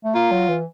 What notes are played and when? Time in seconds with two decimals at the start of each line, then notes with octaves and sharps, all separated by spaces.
0.04 A3
0.14 A#3 F4
0.31 F#3
0.49 E3